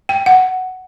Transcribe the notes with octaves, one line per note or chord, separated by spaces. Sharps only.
G5
F#5